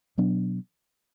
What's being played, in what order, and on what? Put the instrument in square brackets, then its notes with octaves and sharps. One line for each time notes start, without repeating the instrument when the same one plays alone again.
[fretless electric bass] B2 F#3 B3 D4